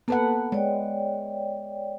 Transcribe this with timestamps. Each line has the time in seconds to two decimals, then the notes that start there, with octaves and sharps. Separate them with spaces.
0.08 A#3 B3 A4 B4 F#5 A5
0.52 G#3 C#5 D5 G5